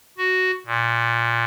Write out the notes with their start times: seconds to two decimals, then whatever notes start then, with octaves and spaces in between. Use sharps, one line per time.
0.18 F#4
0.66 A#2